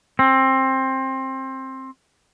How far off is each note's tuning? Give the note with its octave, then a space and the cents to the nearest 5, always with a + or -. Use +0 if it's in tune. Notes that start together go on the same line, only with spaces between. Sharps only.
C4 +20